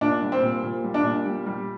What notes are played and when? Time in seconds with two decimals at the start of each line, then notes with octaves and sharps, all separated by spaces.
0.01 A#2 D4
0.22 G3
0.32 C4
0.43 A#2
0.63 A#2
0.84 G3
0.94 D4
1.04 A#2
1.26 G3
1.46 G3